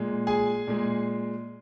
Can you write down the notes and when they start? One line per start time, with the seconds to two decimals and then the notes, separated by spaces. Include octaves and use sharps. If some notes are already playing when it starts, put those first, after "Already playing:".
Already playing: A#2 G#3
0.27 G#4 G#5
0.67 A#2 G#3